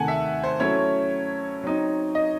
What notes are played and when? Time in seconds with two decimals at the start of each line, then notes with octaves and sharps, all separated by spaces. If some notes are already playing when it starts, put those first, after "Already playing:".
Already playing: C3 D#3 A3 F#5 G#5 A5
0.08 E5
0.44 C5
0.60 F#3 A3 C#4 E4 C#5
1.63 F#3 C4 D#4
2.15 D#5